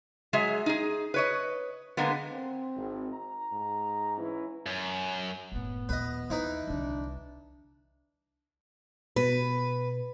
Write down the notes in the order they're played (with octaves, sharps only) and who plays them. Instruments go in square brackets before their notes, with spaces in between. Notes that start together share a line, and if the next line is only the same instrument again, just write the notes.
[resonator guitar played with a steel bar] F#3 G#3 G#4 E5
D#4 G#4
B4 C#5 D#5
D3 G#3 A#3 B3
[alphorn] C4
[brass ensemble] G#1
A#5
[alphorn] G#2
[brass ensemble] E3 C#4
[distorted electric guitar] F#2
[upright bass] F#1 A2 [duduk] B3
[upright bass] A#1 D#2 [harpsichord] B4 D#5
[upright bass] D#2 [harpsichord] E3 D#4 B4
[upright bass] C2 D3 [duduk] D4
[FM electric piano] B2 [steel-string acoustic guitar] B4